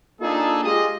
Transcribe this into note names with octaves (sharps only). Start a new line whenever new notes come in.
A#3 D4 D#4 F4 G#4 A4
G#3 F4 G4 G#4 D#5